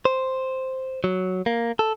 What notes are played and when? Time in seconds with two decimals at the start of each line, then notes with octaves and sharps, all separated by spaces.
0.05 C5
1.04 F#3
1.46 A#3
1.79 A4